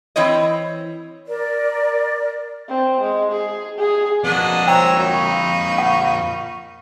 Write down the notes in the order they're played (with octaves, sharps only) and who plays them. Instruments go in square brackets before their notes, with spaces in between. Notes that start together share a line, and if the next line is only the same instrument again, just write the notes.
[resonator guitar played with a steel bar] E3 C4 E4 C#5 D#5
[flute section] A#4 D5
[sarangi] C4
G#3
G#4
G#4
[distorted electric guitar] F2 A#3 [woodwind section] B2 [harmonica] D4 D#5 F#5
[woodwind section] F3 C4 [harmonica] C#5 A#5 E6 [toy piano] G5
[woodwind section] F#2 [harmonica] D#4
[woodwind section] F5 B5 C#6
[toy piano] F#5